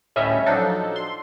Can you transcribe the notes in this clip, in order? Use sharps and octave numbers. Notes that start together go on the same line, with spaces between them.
D2 A2 G3 C#4 D#5 E5
F3 F#3 D4 D#4 A4
C6